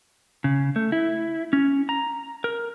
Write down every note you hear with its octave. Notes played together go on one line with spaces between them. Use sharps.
C#3
A3
E4
C#4
A#5
A#4